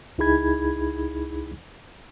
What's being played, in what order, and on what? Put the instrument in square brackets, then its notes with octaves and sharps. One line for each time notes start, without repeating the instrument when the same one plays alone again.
[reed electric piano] C#2 D#4 E4 G#4 B5 G#6